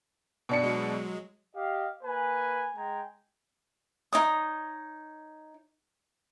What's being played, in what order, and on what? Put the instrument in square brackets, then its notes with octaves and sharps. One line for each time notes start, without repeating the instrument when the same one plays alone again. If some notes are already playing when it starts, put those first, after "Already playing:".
[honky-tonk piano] B2 D4 C#7
[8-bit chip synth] F#3 G#3
[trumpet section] G4 D#5 F5
A#3 B4 G#5
G#3 G5 G#5 A#5
[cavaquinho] D#4 C#5 D#6